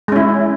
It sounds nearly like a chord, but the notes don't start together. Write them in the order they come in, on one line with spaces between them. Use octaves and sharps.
G#3 C#4 E4